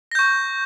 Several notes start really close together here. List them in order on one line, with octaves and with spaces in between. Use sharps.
A#6 G6 C#6